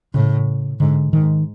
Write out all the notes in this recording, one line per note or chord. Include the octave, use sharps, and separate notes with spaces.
A2 C#3
G#2 D3
G#2 D#3